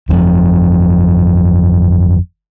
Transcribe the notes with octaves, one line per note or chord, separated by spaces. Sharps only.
G1 F2 A#2 F3